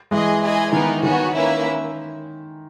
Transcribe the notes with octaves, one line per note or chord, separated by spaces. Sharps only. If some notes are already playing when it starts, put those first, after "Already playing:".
E3 G#3 G#4 D#5 G#5
E4 G#4 D#5 G#5
D#3 B3 D#4 A#4
D#3 B3 F#4 C#5 G#5
A#3 C#4 E4 B4 E5